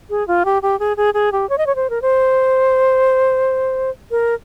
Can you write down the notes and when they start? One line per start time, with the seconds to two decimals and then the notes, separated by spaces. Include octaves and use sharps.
0.10 G#4
0.28 F4
0.45 G4
0.62 G4
0.80 G#4
0.97 G#4
1.14 G#4
1.32 G4
1.49 C#5
1.58 D#5
1.67 C#5
1.76 C5
1.90 A#4
2.02 C5
4.11 A#4